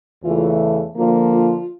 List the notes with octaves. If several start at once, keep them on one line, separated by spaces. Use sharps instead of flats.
E2 C#3 E3 A3 F4
D3 F3 A#3 F4
F4